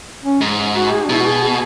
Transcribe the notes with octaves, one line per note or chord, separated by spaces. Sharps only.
C#4
G#2
F#4
G#4
D4
B2 E4
F#4
G#4
G#4